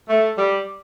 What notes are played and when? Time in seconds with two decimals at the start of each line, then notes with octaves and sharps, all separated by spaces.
0.09 A3
0.38 G3